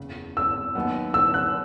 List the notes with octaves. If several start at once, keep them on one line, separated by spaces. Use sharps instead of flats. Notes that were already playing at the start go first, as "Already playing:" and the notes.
Already playing: F#1 E2 C#3
E6
D#2 D#3 F#3 B3
E6
F#6